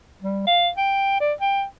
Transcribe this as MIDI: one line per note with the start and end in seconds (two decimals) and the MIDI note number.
0.22 0.44 55
0.47 0.69 77
0.77 1.15 79
1.20 1.33 74
1.41 1.63 79